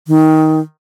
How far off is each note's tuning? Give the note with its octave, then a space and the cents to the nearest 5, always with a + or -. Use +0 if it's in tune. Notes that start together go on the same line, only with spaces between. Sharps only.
D#3 +15